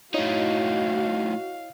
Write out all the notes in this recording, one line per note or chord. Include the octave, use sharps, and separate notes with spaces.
A2 D#4 E4 F#4 C#5 D#5 F5